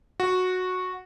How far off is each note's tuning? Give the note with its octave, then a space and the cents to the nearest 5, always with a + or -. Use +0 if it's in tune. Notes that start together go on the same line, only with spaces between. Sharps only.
F#4 -10